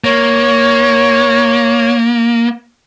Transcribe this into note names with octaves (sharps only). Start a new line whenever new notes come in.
A#3 C#5